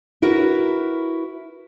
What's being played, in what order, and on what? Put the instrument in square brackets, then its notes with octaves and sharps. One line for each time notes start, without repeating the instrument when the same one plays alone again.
[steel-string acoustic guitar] E4 F#4 A#4 B4